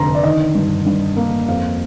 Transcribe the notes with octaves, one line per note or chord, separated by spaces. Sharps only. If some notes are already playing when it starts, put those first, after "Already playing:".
Already playing: F1 D3 A#5 C6
D5
D#3 D#5
G2
G2
A#3
F2 F5